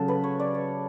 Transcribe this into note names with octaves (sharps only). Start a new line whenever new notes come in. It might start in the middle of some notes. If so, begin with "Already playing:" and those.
Already playing: C#3 F#3 C#4 F#4 A4
B4
C#5
D5
C#5